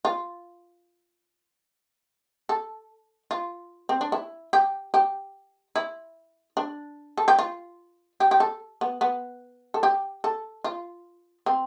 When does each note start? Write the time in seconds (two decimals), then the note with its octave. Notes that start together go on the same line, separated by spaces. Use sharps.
0.05 F4
2.49 A4
3.31 F4
3.89 C4
4.01 D4
4.12 E4
4.53 G4
4.94 G4
5.76 E4
6.57 D4
7.17 A4
7.28 G4
7.39 F4
8.20 G4
8.31 G4
8.40 A4
8.81 B3
9.01 B3
9.74 A4
9.83 G4
10.24 A4
10.64 F4
11.46 C4